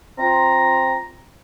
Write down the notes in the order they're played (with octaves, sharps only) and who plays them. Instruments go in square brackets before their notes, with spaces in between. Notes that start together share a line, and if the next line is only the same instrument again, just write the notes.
[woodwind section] C4 F4 A#5